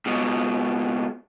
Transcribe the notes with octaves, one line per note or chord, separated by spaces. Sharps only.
C#2 B2